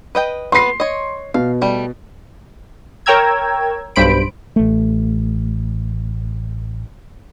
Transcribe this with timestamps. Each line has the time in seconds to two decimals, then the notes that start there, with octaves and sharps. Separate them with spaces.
0.15 B4 D#5 G5
0.52 B3 B4 C6 C7
0.80 C#5 D#5
1.34 B2 F5
1.62 G3 A3
3.06 A#4 C#5 G5 A#5 E6 G#6
3.96 B1 G2 C5 B5 D7
4.56 A1 A3